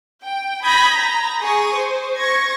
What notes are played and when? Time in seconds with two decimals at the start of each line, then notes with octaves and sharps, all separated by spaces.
0.24 G5
0.64 B5 D#6 G6 G#6 A#6 B6
0.95 A#5
1.42 G#4 C#6 D#6
1.76 C5
2.20 C#6 G#6 A#6